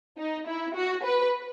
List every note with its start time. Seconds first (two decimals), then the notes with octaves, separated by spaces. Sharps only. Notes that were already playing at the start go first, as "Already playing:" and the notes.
0.18 D#4
0.47 E4
0.75 F#4
1.04 B4